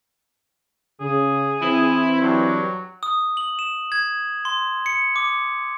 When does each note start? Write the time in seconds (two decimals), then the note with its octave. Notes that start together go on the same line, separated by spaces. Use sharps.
1.01 C#3 G#4
1.62 E3 C4 E4
2.21 G2 F#3
3.03 D#6
3.37 F#7
3.59 E7
3.92 G#6
4.45 C6
4.86 C#7
5.16 D6